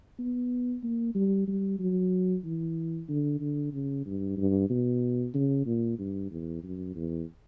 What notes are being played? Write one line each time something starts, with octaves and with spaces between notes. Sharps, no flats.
B3
A#3
G3
G3
F#3
E3
D3
D3
C#3
G2
G2
B2
C#3
A#2
G2
E2
F#2
E2